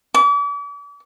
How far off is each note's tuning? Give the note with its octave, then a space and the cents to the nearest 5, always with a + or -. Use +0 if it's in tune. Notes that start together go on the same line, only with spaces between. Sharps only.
D6 -40